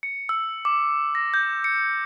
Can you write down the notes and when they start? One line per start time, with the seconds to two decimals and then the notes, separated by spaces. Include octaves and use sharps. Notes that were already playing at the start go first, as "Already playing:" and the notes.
0.03 C#7
0.29 E6
0.65 D6
1.15 A#6
1.34 G6
1.64 C#7